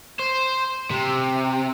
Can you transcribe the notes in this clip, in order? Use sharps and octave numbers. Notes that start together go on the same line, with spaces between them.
C5
C3